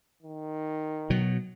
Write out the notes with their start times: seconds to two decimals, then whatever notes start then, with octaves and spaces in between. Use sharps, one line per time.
0.22 D#3
1.10 B2 F#3